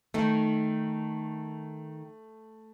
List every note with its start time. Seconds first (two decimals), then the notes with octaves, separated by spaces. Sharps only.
0.14 D#3 A3 D#4